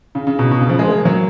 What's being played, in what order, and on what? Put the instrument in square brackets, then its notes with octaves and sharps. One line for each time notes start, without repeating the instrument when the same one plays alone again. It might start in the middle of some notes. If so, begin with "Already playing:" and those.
[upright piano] C#3
C#3
B2
B2
C#3
F3
G#3
A#3
F#3